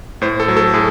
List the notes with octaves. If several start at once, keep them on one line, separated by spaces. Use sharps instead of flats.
A2 C5
A4
F#3
A4
A2 G#4